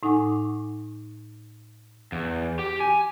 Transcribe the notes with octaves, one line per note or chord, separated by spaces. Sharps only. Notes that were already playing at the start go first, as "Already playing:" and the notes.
A2 D#4 F#5 G#5 C#6 D6
E2
G4
G#5